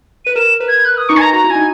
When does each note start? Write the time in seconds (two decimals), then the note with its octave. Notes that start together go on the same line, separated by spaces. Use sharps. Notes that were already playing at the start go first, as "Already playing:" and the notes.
0.25 B4 D#7
0.36 A#4 E7
0.60 B4
0.68 G#6
0.85 B4 F#6
0.97 D#6
1.09 D#4 C#6
1.17 G#5
1.21 A#5
1.33 F#4 A#5
1.44 E4
1.50 G#5
1.55 D#4